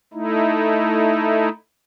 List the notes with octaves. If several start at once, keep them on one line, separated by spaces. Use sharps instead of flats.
A3 D#4 E4